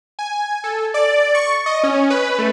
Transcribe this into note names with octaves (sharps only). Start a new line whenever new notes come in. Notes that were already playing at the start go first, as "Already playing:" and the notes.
G#5
A4
D5
C#6
D#5
C#4
B4
A3